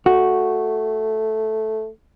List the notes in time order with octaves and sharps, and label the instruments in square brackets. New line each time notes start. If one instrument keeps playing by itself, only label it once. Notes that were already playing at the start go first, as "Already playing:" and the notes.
[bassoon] A3 [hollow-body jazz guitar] F#4